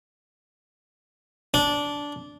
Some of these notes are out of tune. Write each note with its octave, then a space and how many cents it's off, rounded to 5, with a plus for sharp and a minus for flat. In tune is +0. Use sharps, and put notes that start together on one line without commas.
D4 -15